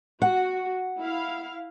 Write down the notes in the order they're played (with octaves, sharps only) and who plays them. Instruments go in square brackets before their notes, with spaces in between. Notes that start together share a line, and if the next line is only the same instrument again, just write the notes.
[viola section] F#4 [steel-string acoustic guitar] F#5
[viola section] E4 F5